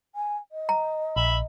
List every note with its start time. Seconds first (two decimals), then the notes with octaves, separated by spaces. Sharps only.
0.15 G#5
0.52 D#5
0.69 A#5
1.16 A#1 E5 B5